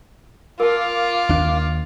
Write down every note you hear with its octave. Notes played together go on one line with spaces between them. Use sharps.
F4 A#4 F5 A5 D6
D#2 D4